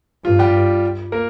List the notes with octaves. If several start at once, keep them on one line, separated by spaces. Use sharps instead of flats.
G2 F4
G3 G4
A#3 A#4